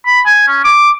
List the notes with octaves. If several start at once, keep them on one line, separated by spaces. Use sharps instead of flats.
B5
G#5
C#4
D6